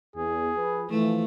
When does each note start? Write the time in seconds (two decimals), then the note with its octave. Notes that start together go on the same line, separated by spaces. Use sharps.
0.16 E2 G#4
0.56 F3 B4
0.90 E3 F3 A3